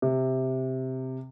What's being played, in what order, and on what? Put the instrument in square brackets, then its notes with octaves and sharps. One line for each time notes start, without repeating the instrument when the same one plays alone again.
[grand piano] C3